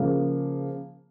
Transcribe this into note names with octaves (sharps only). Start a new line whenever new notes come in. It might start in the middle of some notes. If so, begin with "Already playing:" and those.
Already playing: C#3 F3 A#3